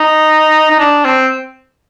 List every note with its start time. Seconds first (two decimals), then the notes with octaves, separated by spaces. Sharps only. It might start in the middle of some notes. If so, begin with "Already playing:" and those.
Already playing: D#4
0.71 D#4
0.80 D4
1.05 C4